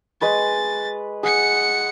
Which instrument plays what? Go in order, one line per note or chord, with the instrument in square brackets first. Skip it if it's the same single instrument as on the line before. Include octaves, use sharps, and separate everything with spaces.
[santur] G#3 B4 C#6 [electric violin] A6
[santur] G#4 [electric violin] F#5 C#7